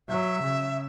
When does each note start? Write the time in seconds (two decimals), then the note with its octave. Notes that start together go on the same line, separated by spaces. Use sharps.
0.08 F#3 E5
0.42 C#3